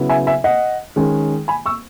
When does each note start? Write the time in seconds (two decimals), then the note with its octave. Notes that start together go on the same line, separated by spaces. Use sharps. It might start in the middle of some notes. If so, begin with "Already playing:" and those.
Already playing: C#3 F#3 B3 E4
0.09 E5 G#5
0.27 E5 G#5
0.44 D#5 F#5
0.96 D#3 G#3 C#4
1.48 G#5 B5
1.66 C#6 E6